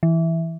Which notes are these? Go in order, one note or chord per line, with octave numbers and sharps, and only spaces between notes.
E3